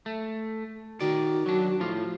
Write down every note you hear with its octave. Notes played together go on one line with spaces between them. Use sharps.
A3
D#3 F#4 D5
F#3 D4
A2 F3 F4